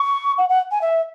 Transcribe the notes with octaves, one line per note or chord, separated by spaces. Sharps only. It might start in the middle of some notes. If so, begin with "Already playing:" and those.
Already playing: C#6
F#5
F#5
G#5
E5